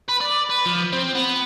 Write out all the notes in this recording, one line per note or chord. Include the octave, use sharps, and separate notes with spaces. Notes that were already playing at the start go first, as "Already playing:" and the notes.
B4
D5
B4
F3
C4
B3